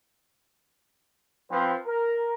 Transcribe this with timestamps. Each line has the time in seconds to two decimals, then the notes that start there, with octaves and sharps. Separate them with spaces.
1.50 F3 C4 B4
1.86 A#4